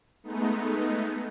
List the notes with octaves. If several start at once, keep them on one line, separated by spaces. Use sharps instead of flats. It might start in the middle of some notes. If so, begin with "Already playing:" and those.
G#3 A3 B3 D#4